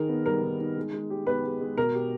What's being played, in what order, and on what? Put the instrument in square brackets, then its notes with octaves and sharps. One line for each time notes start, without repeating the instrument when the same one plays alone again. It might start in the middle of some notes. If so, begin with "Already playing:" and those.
Already playing: [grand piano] D#3 D#4 G#4 [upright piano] A#4
[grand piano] B3
[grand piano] G3 [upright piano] A#4
[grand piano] D#3
D#4
G#3
G#3
G4
[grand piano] B3 [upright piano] B4
[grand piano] G#3
G#3
[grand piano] B2 [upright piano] A#4
[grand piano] G4